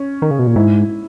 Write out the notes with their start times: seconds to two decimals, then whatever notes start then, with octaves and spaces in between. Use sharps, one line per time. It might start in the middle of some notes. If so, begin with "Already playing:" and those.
Already playing: C#4
0.22 D#3
0.31 C#3
0.39 B2
0.47 A#2
0.56 G#2 E4